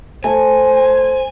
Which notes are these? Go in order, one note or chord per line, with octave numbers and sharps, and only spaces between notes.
A3 C5 G#5